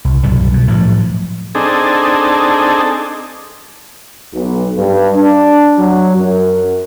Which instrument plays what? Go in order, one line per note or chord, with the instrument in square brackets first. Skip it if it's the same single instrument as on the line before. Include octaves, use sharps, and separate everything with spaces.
[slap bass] C2
C2 F#2 B2 G3
B2
A2 F3 F#3
[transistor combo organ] C4 D4 D#4 G#4 A4
[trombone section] B1
G2
D4
F#3
F#2